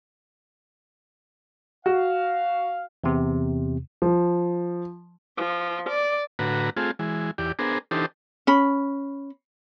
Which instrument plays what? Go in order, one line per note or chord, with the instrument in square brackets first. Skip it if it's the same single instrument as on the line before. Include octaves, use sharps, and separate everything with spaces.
[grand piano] F#4 [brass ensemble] F5
[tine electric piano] E2 C3
[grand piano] F3
[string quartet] F3
D5
[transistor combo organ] A2 D3 F#4 B4 A#5
A3 C4 F4 G#4
E3 G#3
E2 G4 D5
B3 D4 G#4 A#4 C5
E3 D4 D#4 G4 A4 C5
[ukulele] C#4 B5